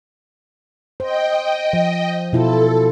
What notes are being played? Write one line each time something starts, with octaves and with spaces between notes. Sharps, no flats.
C5 D#5 G5
F3
B2 E4 F4 A4